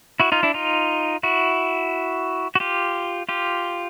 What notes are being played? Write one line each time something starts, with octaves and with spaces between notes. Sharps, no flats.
E4 F#4
D#4 F4
D4 E4
D#4 F4
E4 F#4
F#4
F4 G4
F4 G4